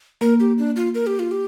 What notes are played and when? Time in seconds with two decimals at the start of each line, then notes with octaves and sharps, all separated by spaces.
0.21 A#3 A#4
0.40 G4
0.58 D4
0.76 F4
0.95 A#4
1.07 G4
1.19 F4
1.31 G4